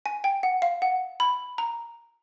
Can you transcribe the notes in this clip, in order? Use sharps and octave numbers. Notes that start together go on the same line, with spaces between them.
G#5
G5
F#5
F5
F#5
B5
A#5